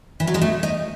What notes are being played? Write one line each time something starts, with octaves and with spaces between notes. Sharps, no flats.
E3
F#3
G#3
A3
D#4